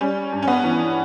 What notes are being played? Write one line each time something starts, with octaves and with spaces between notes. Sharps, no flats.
G3 C#4
G2
C#4
B3
E3